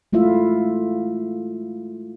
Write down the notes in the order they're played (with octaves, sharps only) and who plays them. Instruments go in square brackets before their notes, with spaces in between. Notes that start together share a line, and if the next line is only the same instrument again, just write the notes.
[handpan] G#3 A3 E4 F4 E5